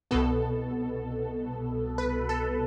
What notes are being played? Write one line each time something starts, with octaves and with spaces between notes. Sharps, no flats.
C2 B2 B3 A4
B4
A4